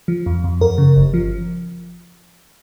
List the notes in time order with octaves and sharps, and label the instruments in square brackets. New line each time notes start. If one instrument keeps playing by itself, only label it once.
[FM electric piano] F3
F2
F2
F#2 A#4
C#3
G1
F3